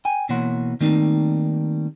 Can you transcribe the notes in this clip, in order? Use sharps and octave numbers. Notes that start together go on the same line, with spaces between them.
G5 G#5
B2 E3 A#3 C#5 F#5 C6
D#3 G3 A3 A#3 C4 D#4